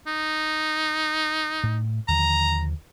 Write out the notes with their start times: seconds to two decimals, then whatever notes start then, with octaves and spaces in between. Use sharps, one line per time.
0.07 D#4
1.63 A2
2.08 D#2 D3 F3 A#5